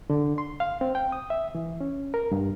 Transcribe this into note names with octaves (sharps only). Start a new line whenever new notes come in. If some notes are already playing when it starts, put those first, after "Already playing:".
D3
C6
F5
C4
G5
D#6
E5
E3
C#4
A#4
G2